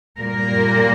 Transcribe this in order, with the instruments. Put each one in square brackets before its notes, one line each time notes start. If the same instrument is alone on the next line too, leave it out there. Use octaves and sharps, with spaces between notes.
[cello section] A#2 G3 A#3 A#4